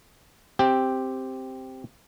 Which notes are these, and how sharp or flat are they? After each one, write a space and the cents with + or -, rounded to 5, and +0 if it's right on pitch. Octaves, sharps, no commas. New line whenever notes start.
C4 +0 G4 +0